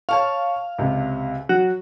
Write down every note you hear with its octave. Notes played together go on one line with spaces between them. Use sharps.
C#5 F5 A5 C#6
C#2 C3
F#3 F#4